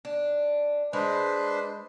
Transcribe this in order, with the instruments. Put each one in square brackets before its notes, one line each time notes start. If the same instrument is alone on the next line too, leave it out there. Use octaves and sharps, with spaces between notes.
[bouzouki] D4
[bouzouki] G#3 [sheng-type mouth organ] D4 B4 C5